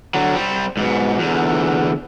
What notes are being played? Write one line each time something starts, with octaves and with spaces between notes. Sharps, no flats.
D3 F#3
G3 C4
G#2 B2
E2 D3